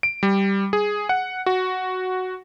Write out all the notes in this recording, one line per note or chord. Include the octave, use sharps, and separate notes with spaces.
D7
G3
G#4
F#5
F#4